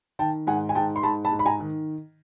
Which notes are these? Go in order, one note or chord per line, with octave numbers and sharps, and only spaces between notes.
D#3 G5 A5
G#2 F#5 G#5
G#5
G#2 G5 A5
C6
G#2 A5 B5
A5 B5
G#2
B5
G#5 A#5
D#3